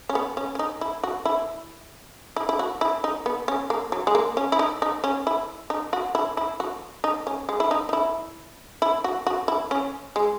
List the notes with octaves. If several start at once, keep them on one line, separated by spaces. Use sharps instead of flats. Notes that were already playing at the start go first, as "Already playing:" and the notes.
C#4
B3
C#4
C#4
D#4
E4
F#4
E4
E4
E4
F#4
E4
D#4
B3
C#4
A#3
F#3
G#3
A#3
C#4
E4
D#4
D#4
C#4
E4
D#4
F#4
E4
E4
F#4
D#4
C#4
G#3
E4
D#4
D#4
E4
E4
F#4
F#4
E4
C#4
G#3